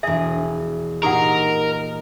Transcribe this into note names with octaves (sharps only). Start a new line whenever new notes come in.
E1 G#4 E5
A#2 D#4 G4 A#4 F#5